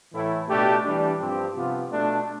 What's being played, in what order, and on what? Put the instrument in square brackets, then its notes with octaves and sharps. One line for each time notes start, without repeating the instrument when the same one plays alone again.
[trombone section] A2 E3 A3 E4
B2 A3 D4 G4
E3 G3 D4
G2 F3 C4 G4
C3 F3 B3 F4
B2 A3 D4